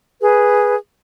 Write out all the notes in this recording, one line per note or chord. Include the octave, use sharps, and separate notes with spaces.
G#4 B4